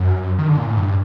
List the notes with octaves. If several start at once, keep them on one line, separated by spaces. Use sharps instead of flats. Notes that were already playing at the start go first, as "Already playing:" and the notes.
Already playing: F#2
D#3
D3
A#2
A2
G2